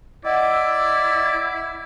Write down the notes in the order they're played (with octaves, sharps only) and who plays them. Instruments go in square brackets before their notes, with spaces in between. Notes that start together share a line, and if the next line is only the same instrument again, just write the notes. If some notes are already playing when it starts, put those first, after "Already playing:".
[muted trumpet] E4 [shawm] D5 [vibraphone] D#5 F#5 E6